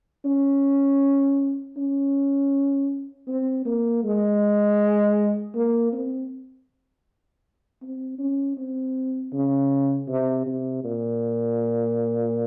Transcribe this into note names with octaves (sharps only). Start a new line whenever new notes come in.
C#4
C#4
C4
A#3
G#3
A#3
C4
C4
C#4
C4
C#3
C3
C3
A#2